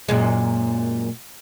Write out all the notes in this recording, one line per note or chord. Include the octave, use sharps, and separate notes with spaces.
F#2 A#2 G#3